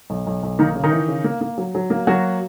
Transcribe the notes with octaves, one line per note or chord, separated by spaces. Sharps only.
B1
B1
B1
D#3 A#3 D#4
C#3
D#3 D#4
E3
C#3
A#3
A#3
F#3
F#3
A#3
F#3 A#3 F#4